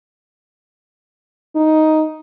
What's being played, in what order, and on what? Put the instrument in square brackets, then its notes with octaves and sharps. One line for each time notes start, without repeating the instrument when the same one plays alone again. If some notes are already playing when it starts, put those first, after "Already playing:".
[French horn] D#4